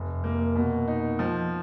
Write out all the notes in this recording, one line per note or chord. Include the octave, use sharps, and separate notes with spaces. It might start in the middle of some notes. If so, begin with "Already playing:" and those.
Already playing: F1
A#3
B2
D#4
F3